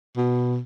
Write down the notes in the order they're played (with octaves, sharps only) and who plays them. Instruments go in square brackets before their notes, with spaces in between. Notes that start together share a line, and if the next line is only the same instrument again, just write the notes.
[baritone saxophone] B2